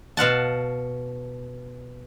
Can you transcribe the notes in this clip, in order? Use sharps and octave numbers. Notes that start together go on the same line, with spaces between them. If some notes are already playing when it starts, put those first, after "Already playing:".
B2 F5 F#5 A5